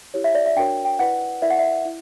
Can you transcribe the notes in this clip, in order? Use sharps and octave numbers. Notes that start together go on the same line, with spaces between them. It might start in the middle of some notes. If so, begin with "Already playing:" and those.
E4 G4 C#5
E5
D5
E5
D4 F#4 A#4 C#5 G5
G5
E4 B4 D5 F#5
E4 A#4 D5 E5
F#5
E5
E4